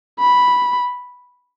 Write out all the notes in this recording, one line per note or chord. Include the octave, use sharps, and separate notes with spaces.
B5